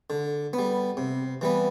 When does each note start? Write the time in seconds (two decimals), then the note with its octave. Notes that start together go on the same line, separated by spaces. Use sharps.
0.10 D3
0.53 B3
0.59 G3
0.97 C3
1.41 E3 G3 B3